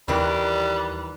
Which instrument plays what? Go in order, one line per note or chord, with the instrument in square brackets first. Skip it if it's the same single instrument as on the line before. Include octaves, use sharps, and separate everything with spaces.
[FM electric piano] D#2 F#6 [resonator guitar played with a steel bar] D#3 E3 A#4 [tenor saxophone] G3